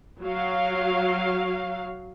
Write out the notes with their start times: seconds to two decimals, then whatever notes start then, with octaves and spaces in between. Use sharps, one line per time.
0.23 F#3 F5